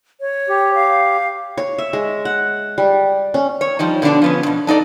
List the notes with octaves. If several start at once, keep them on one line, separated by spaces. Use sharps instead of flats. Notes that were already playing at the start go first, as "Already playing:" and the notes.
C#5
G4
F5
C#5
E5
G#3
F#5
G3
C#4
C#5
F3 G3 D#4
B2 D3 D#3 D4 D5
F3 B3 C#4
G#2 B2
D4 D#4 A4 D5